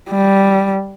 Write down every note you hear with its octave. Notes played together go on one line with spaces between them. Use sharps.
G3